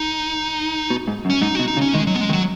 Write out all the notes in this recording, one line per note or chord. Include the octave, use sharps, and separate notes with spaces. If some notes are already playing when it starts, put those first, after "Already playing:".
Already playing: D#4
B2
G#2
F#2
C#4
G#2 D#4
F#4
B2
D#4
C#3
C#4
D#3 G#3
F#3
B3
G#3
D#3
F#3